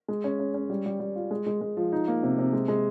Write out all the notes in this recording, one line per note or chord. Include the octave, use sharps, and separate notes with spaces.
G#3
C#4
C#4
C#4
G3
G3
G3
F4
G#3
G#3
G#3
F3
D#4
A#3
C3
C3
G#3
G#3